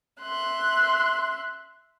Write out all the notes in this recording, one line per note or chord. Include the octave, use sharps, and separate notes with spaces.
E5 C6 F#6